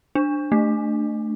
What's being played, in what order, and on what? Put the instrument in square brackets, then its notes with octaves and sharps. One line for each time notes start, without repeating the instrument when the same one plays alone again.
[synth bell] D4
A3